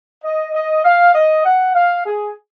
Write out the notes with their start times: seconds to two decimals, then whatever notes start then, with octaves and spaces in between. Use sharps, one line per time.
0.24 D#5
0.53 D#5
0.84 F5
1.14 D#5
1.44 F#5
1.75 F5
2.05 G#4